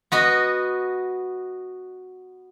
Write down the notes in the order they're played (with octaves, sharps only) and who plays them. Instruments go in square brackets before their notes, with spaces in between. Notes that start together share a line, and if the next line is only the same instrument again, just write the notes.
[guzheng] B3 F#4 D#5